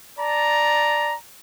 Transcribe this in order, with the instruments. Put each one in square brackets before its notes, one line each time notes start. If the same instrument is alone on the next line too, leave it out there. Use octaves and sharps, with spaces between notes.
[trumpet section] D5 A5 A#5